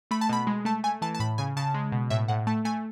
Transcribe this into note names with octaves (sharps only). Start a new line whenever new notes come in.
A3 B5
A5
B2 B5
G#3
A3 A5
A3 G#5
E3 A5
A5
A2 B5
C#3 G#5
C#3 A5
G#3
B2
A2 E5
A2 F#5
A3 A5
A3 G#5